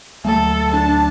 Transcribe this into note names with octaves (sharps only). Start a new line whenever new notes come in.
D2 F#3 A3 A4
D4 A5